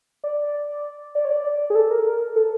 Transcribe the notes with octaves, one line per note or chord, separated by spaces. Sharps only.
D5
D5
C#5
D5
D5
G#4
A4
A#4
A4